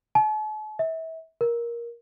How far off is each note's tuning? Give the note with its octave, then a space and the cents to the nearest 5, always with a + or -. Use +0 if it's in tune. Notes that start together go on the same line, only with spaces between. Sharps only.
A5 -45
E5 -30
A#4 +15